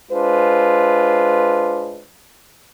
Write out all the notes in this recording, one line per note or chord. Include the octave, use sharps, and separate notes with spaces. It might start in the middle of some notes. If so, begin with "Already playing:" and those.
G#3 D4 F4 B4 C5